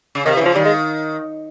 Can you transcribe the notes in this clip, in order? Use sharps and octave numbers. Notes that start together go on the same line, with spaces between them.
C#3
C3 D#3
E3
C#3 F3
D#3 G3
G#3